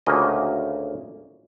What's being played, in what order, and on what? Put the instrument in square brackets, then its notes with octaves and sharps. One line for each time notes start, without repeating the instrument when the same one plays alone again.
[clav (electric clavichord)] D2 A#2 C#3 A#3 C#4 D#5